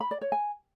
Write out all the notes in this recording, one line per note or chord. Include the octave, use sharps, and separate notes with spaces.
B5
D5
C#5
G#5